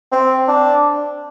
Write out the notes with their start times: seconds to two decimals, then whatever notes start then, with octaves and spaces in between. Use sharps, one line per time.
0.12 C4
0.48 D4